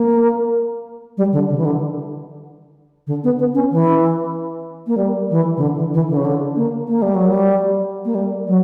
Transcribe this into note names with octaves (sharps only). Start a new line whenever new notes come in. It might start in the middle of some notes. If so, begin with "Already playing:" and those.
Already playing: A#3
G3
D3
C#3
E3
D3
D3
B3
B3
C#4
E3
A#3
G3
E3
C#3
D3
E3
E3
D3
C#3
D3
A#3
A#3
G3
F#3
G3
A#3
G3
F#3